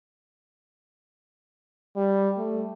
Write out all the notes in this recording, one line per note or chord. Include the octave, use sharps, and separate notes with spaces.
G3
A3